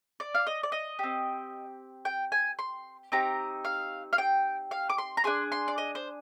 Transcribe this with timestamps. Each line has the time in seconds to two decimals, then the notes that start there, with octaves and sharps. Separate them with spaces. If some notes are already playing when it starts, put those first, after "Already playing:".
0.20 D5
0.35 F5
0.47 D#5
0.63 D5
0.72 D#5
0.99 C4 G4
2.05 G5
2.32 G#5
2.59 C6
3.12 C4 D#4 G4 A#5
3.65 F5
4.13 F5
4.18 G5
4.71 F5
4.90 D6
4.98 C6
5.17 A#5
5.24 D4 G#4 C6
5.52 C6
5.68 D5
5.78 D#5
5.95 C5